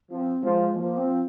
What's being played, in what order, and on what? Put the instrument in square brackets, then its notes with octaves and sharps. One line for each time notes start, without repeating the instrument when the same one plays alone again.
[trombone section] F3 [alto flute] C4
[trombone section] F3 [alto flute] G#3
[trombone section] F3 [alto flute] A#3
[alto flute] C4